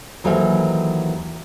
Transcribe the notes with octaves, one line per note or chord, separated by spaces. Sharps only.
D#2 E3 F#3 A4 C5 F5